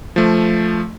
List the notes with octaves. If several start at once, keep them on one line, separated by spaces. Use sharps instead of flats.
F3 A3